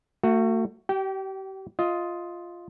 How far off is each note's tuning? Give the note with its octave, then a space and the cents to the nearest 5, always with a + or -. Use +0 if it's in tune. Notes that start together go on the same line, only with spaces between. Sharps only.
A3 +40 F#4 +0
G4 -35 G5 -10
F4 +0 D#5 +15